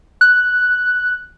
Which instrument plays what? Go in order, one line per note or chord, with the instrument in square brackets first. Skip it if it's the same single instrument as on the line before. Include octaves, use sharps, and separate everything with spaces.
[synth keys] F#6